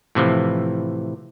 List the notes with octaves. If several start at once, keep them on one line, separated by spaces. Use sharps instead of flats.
A2 C3 E3 F3